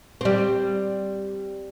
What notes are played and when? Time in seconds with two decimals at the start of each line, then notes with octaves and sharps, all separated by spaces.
0.21 G3 C4